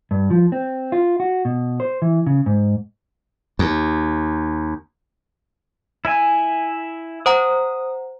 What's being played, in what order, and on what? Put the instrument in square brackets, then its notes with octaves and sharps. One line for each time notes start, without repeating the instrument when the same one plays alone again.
[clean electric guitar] G2
F3
C4
F4
F#4
B2
C5
E3
C#3
G#2
[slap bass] D#2
[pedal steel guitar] E4 E5 G#5
[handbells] C5 F#5 A#5 [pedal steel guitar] D#6